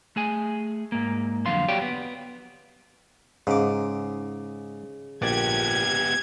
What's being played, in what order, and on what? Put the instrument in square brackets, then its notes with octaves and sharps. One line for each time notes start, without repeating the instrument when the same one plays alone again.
[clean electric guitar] A3 G#4 G#5
G#2 A#3
F2 D3 F#3 F5 C6
F#4 G4 C#5 D5 F5 G5
B3
[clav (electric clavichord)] G#2 [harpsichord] C#3 D6
[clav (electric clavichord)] A#1 D5 [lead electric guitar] B3 G4 [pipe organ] G#6